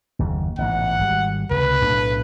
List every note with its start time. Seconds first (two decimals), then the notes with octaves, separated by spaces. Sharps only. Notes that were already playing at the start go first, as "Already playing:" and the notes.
0.19 F#1 D#2
0.58 A1 G#2 B2 F#5
0.99 G#1 G3
1.51 C#2 C3 B4
1.82 B1 A2 D4